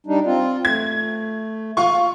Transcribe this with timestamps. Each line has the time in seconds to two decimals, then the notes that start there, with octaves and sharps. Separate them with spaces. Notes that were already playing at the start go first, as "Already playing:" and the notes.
0.07 G3 D4 D#4
0.25 C4 F4
0.65 A3 G#6
1.77 F4 C#6